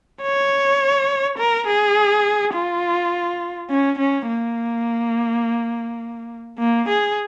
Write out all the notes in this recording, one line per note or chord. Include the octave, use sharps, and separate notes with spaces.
C#5
A#4
G#4
F4
C#4
C#4
A#3
A#3
G#4